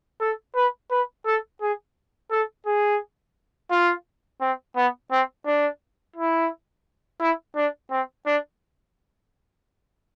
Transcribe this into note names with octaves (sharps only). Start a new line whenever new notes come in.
A4
B4
B4
A4
G#4
A4
G#4
F4
C4
B3
C4
D4
E4
E4
D4
C4
D4